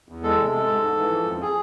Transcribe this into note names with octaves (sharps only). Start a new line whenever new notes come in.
E2
G#3 A4
C3
G#3
G#2
G#2
E3
F3
F2
G#4